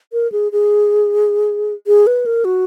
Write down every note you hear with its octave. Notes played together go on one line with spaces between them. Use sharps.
A#4
G#4
G#4
G#4
B4
A#4
F#4